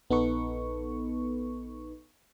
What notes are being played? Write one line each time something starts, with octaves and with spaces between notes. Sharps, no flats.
A#1 B3 D#4 A4 B4 C#6